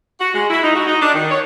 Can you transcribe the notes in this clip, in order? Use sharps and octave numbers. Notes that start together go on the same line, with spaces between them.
F#4
G#3
E4
D#4
F#4
D#4
D4
D#3
C#5